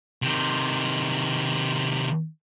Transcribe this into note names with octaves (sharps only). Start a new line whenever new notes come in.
C3 D#3